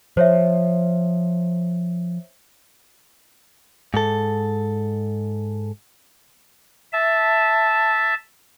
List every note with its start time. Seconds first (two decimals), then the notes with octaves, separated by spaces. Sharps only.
0.17 F3 C5 C#5 E5
3.94 G#2 A4
6.93 E5 A5